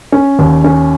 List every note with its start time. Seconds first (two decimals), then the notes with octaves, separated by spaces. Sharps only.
0.12 C#4
0.39 D#2
0.64 C#4